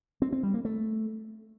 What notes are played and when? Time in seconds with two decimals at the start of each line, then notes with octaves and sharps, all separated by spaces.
0.22 C4
0.32 C4
0.43 G3
0.54 A#3
0.65 A3